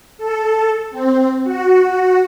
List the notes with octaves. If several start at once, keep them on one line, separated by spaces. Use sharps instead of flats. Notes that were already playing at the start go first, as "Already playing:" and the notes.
A4
C4
F#4